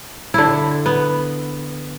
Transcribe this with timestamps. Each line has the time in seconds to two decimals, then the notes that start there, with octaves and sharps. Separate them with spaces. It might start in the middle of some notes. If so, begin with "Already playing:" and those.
0.34 D3 E4
0.86 B3